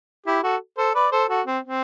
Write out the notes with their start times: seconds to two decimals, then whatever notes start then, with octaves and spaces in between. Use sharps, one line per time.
0.26 E4 G4
0.43 F#4 A4
0.77 A4 C5
0.95 B4 D5
1.12 A4 C5
1.29 F#4 A4
1.46 C4
1.64 C4